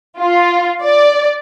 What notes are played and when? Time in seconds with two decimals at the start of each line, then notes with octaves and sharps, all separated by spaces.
0.19 F4
0.82 D5